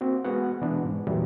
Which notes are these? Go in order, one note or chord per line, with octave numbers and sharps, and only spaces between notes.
A#3 C4 F#4
G#3 B3 F#4 B4 F#5
B2 E3 G#3 B3 D4
G#2
E2 A#2 E3 F#3 G3